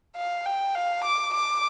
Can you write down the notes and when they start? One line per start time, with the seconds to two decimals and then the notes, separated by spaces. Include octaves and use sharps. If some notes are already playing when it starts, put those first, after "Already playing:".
0.16 F5
0.46 G5
0.75 F5
1.04 D6
1.34 D6